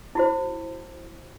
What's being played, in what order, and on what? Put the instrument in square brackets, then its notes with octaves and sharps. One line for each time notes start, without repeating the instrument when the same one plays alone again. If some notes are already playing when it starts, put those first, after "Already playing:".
[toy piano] E4 F#4 C5